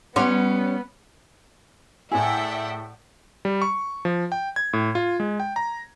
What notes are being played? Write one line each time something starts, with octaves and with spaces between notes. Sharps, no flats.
G3 B3 C#4 C#5 F#5 C6 D6
A2 E4 G#4 D5 E5 F#5 G5
G3
C#6
F3
G5
G#6
A2
F4
G#3
G5
A#5